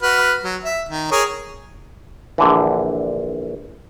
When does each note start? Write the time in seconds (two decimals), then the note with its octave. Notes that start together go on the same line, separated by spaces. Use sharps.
0.02 F#4 B4 F6
0.43 F#3
0.64 E5
0.89 D#3
1.11 G#4 A#4 C#5
2.38 A#1 D3 E3